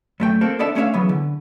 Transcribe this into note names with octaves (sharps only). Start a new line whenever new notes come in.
F#2 A3 G5
A#3 C4 A4
B3 D4 A4 D5 E5 A5
A3 C#4 D4 C#5 E5 F5
C#3 E3 F#3 B3
D3